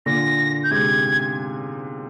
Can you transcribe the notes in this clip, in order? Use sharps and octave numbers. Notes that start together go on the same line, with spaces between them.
A#2 D3 A#6
G6
G#2 C3 G#6